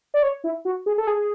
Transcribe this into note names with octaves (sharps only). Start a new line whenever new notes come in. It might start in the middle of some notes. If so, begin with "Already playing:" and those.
D5
C#5
E4
F#4
G#4
A4
G#4